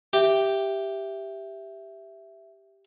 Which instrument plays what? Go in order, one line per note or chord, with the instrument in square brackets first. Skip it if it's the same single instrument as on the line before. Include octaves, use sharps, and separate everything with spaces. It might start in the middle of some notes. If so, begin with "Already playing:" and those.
[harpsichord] G4 [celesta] E5